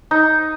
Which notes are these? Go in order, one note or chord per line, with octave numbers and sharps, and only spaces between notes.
D#4